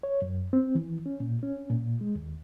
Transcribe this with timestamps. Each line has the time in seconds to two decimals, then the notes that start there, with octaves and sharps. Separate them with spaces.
0.03 C#5
0.22 F#2
0.53 C4
0.75 E3
1.06 C#4
1.20 A#2
1.43 C#4
1.70 A#2
2.01 G#3
2.15 D#2